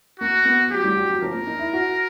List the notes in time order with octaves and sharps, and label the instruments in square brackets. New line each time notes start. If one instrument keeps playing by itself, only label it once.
[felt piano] A#3 [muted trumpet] F#4
[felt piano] B3
[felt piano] F#3 [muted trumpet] G4
[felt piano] G3
F#3
F#3
[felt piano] F3 [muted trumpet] A#4
[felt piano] A#3
D#4
E4
F#4